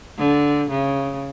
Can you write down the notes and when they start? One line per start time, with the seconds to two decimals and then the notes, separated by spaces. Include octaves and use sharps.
0.19 D3
0.70 C#3